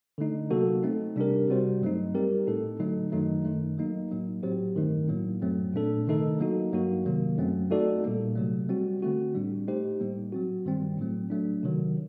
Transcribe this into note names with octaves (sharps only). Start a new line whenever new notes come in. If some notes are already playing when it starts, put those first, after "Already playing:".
D3 A3 D#4
C3 F#3 A#3 F#4 A4
A3 C4 D#4
C3 G3 D4 G4 A#4
C3 G3 C4 F#4 C5
G2 F#3 A3 D#4
G3 C4 G4 A#4
A2 A3 D#4 A4
D3 F#3 A3 D#4
F#2 D#3 F#3 A3 D#4
F#2 D#3 A3
F#3 A#3 D#4
A2 F#3 A#3
A2 F#3 C4 G4 C5
G2 D#3 A3 D#4
A2 F#3 A#3
F#2 F#3 A3 C4
A#2 A3 D4 A4
C3 D#3 A3 D#4 A4
F#3 A#3 D#4 F#4
G2 F#3 A#3 F#4
C3 D#3 F#3 A#3
F#2 F#3 A3 C4
A3 D#4 F#4 A4 D5
A#2 G3 A#3
C3 F#3 A3
G3 C4 F#4
D3 A3 C4 F#4
A2 G3 D4
A3 D#4 G4 C5
A2 G3 A#3
F#3 C4 F#4
G2 D#3 G3 C4
A2 F#3 A3
F#3 A3 D4
C3 D#3 F#3